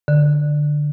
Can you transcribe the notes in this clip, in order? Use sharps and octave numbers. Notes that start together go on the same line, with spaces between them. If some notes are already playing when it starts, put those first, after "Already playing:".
D3